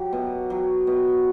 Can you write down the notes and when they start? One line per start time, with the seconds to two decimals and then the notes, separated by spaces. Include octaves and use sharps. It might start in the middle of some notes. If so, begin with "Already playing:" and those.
Already playing: F#3 G4
0.13 B2
0.50 F#3
0.87 B2